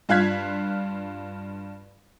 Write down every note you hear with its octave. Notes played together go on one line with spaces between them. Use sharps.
G2 F4 F5 F#6 G#6 B6